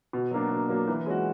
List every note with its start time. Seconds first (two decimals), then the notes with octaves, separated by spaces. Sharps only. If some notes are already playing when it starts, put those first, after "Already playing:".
0.13 B2
0.31 F#3 A#3 D4
0.51 B2
0.69 F#3 A#3 D4
0.87 E3
1.06 G#3 C#4 F#4